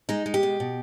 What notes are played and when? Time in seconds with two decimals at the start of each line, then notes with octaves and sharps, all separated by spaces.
0.09 G#3 D#4
0.26 G#3
0.34 G4
0.43 B2
0.60 B2